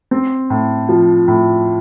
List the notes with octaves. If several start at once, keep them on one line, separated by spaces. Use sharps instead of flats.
C4
A2
F3
A2